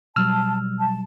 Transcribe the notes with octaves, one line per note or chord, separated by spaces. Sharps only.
B2 F#3 G3 A5 E6 F6
A5